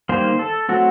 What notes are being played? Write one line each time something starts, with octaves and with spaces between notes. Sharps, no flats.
D#3 G3 A#3 C5
A4
F#3 A3 C4 F#4